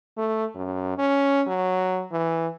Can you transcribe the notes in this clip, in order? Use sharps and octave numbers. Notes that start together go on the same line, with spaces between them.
A3
F#2
C#4
F#3
E3